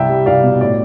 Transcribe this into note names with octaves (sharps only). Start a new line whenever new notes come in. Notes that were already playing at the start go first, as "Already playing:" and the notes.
Already playing: C2 E5 G5
G3
C2 D5 F5
B2
A2 D5